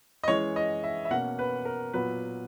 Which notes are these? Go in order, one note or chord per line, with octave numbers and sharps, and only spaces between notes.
D#5
E3 G#3 C#4 C#5
D#5
E5
E5
B2 A#3 C#4 F#5
B4
A#4
A#2 F#3 B3 B4